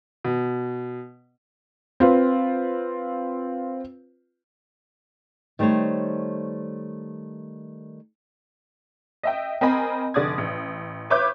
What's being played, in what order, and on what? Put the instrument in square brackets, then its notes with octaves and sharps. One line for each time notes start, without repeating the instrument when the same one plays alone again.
[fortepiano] B2
[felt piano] C4 F4 B4
[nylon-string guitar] D#3 G3 A3 C5 C#5
[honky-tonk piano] D#5 E5 G5
C4 A#4 D#5 G#5 B5
F1 D3 D5 D#6 G#6
A1
B4 C#5 E5 D6 G6